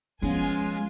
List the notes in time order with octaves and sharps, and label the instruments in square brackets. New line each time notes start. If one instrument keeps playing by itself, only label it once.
[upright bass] F3 [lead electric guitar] G#3 [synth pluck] B3 C#4 [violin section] F4 G#5